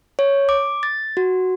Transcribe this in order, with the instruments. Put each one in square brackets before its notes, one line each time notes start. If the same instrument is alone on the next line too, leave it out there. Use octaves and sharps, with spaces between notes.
[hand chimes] C#5
D6
A6
F#4